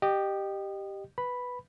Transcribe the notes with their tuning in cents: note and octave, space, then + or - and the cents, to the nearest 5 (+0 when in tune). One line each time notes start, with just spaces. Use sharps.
G4 +0 D#5 -25
B4 +0 B5 +0